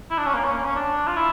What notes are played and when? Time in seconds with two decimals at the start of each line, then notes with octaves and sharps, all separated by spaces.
0.10 E4
0.18 D4
0.26 C#4
0.34 A#3
0.44 C#4
0.55 A#3
0.64 C#4
0.75 D4
1.07 F4
1.16 E4